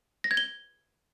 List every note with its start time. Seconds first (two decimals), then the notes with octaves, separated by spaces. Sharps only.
0.24 A#6
0.31 G#6
0.37 G7